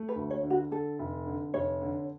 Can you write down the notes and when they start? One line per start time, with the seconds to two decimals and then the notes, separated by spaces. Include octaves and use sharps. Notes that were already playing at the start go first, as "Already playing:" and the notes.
Already playing: A3
0.09 B4
0.16 D2
0.30 C#5
0.43 D3
0.50 F#4
0.71 D3 A4
0.99 F1
1.26 D3
1.54 F1 C#5
1.82 D3